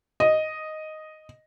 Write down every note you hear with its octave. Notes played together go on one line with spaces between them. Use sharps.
D#5